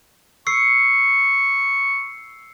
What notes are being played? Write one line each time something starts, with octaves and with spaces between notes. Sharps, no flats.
C#6 E6 C7 C#7